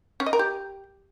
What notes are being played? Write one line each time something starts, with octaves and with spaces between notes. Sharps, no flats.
C#4
D#5
A#4
G4